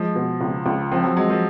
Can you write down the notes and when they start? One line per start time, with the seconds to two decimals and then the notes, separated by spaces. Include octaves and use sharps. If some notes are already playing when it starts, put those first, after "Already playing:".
Already playing: F3 G#3
0.15 B2
0.41 C#2
0.66 C#2
0.92 F3 C4
1.04 F#3
1.17 F#3 G#3
1.30 F3